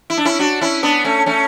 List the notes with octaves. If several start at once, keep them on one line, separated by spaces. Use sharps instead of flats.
E4
D4
C#4 E4
D4 F#4
C#4 E4
B3 D4
A3 C#4
A3 C#4